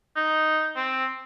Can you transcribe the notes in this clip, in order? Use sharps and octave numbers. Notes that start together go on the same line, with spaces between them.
D#4
C4